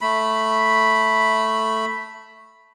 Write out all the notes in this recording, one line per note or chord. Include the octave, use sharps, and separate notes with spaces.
A3 B5